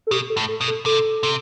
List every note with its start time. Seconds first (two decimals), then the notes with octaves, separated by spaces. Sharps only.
0.07 A4
0.11 B2 G4
0.30 A4
0.37 A2
0.49 A4
0.61 B2
0.68 A4
0.86 C3 A4
1.23 C3